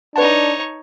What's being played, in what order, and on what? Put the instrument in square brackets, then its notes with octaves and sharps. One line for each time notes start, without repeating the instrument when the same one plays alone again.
[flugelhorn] D4 [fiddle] D#4 C#5 [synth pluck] B4 F#5 A5